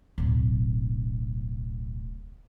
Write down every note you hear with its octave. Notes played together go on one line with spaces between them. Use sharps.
D1 B1